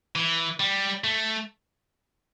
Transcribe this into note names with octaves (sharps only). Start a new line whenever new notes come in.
E3
G3
A3